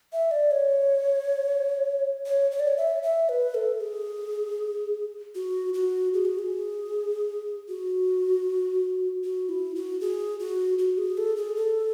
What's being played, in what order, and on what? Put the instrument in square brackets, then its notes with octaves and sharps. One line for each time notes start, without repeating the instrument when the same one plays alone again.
[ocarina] E5
D5
C#5
C#5
C#5
D5
C#5
E5
E5
B4
A4
G#4
F#4
F#4
G#4
F#4
G#4
F#4
F#4
E4
F#4
G#4
F#4
F#4
G#4
A4
G#4
A4